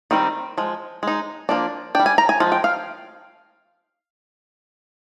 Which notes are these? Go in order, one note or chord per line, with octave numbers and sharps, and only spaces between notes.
D#3 G3 C4 D#4
F3 G#3
G#3 D#4
F3 A#3 D4
G3 D4 G5
G#5
A#5
G#5
F3 G#3
G5
F5